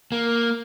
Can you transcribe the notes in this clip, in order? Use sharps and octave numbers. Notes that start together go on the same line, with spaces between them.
A#3